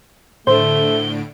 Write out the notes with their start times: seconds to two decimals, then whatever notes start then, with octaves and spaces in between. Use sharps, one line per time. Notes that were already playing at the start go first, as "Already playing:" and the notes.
0.47 A2 D3 A3 C5 D7 G7